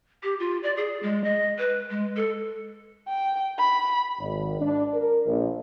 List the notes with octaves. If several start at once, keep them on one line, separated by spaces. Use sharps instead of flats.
G4
F4
D5
G#4
G#3
D#5
B4
G#3
A4
G5
B5
G#1
D4
A#4
A#1